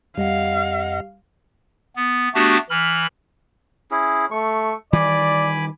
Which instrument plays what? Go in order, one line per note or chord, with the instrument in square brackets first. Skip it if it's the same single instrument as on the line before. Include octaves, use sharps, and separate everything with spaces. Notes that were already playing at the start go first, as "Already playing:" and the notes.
[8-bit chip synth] F2 D#5 F#5 [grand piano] G3 [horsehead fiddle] F5
[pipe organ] B3
A3 B3 D4 F#4 G4
E3 B5 F6
[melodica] C#4 E4 G#4
[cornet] A3 [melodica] C#6
[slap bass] D#3 E3 G3 [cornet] D5 [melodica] G#5 B5 D6